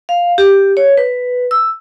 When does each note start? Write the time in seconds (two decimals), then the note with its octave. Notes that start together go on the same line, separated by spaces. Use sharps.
0.09 F5
0.38 G4
0.77 C#5
0.97 B4
1.51 E6